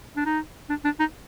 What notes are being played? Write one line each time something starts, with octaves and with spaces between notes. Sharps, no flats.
D4
D#4
D4
D4
D#4